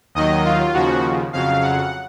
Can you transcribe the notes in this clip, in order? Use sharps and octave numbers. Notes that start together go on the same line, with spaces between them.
D#2 D#3 F#3 D#5
F4
D#2 C#3 F3 F#4
F2 C#3 F#3 F5
F#5